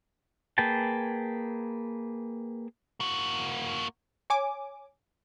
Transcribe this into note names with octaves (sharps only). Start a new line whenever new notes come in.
A#3 G#4 B4 G5 A5
A#3 F#4
C#5 G#5 D6